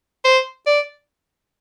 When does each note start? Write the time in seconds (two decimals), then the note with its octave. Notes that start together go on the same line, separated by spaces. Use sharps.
0.25 C5
0.67 D5